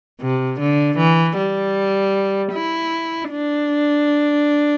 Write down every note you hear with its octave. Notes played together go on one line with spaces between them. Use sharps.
C3
D3
E3
G3
E4
D4